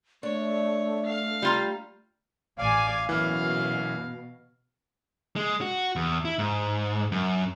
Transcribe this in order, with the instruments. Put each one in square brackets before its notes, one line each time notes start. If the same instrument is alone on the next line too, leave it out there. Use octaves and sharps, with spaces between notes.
[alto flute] A3 [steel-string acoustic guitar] D4 [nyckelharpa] C#5
[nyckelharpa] F5
[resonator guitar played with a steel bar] G3 F4 A#5
[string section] A1 G#5 [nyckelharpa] D5 [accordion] F5
[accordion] F#2 [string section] B2 [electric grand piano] E3 [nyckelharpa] F5
[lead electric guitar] G#3
F#4
E2
E4
G#2
F#2